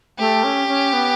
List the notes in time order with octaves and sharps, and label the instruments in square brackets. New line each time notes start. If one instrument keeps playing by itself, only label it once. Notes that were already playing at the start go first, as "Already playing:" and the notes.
[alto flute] A3 [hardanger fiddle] G4
[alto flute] C#4
C#4
B3